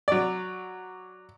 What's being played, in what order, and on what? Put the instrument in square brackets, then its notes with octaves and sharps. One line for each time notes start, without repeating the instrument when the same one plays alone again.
[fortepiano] F#3 D5